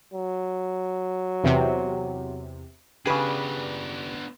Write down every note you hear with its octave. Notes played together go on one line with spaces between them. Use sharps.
F#3
E2 C3
C#3 B3 D4 G4 G#4 B4